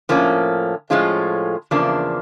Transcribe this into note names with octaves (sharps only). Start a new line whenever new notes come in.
A2 F3 A#3 C#4
A2 F3 G#3 C#4 F4
E2 C#3 F3 A#3 D4